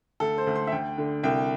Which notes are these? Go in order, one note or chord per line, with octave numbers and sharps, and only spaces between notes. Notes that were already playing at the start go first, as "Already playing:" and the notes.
D2 A4
C5
D2
C6
E5
D2 G5
D3
C2 G5